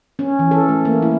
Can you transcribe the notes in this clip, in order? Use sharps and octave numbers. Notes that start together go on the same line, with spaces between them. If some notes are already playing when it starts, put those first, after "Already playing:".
C#4
E3
A4
A3
A#3
E4